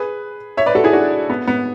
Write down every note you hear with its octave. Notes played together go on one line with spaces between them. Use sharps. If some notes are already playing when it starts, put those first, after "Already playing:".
Already playing: G#4 B4
C#5 E5
B4 D5
F#4 A4
E4 G#4
D4 F#4
B3
B3